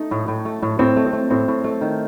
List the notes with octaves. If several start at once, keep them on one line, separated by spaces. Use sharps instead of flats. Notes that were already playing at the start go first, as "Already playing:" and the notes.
Already playing: A3 D#4
A2
A2
A3
A2
A2 C4
A3
C4
A3
A2 C4
A2
A3
D#3